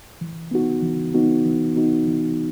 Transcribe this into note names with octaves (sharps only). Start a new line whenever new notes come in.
E3
B3 D#4 F#4
E3
B3 D#4 F#4
E3
B3 D#4 F#4
E3